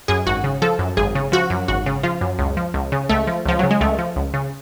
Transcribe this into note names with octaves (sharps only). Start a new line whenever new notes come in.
F#2 G#4
G#1 F#4
C#3
F3 A4
F#2
G#1 G#4
C#3
F3 F#4
F#2
G#1 F#4
C#3
F3 F4
F#2
C#2
F3
C#2
C#3
C#2 A3
F3
C#2 F3
C#3 F#3
G#3
C#2 A3
F3
C#2
C#3